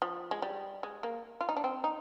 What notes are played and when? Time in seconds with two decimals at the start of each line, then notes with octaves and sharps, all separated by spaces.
0.02 F3
0.31 G#3
0.42 G3
0.83 G#3
1.03 A#3
1.41 F4
1.49 D#4
1.57 D4
1.64 C4
1.84 D#4